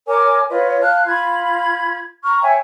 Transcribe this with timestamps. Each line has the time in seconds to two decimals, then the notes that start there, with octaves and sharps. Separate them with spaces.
0.07 A#4 C#5 G#5 D6
0.49 F4 B4 C#5 D#5
0.80 F5 A5 F6 F#6
1.05 F4 B5 G#6
2.23 A#5 C#6 F6
2.42 C#5 E5 G5 G#5